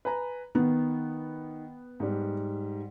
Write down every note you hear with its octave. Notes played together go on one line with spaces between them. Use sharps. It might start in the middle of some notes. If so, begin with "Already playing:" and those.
B4 G#5 A#5
D#3 B3
G#2 G3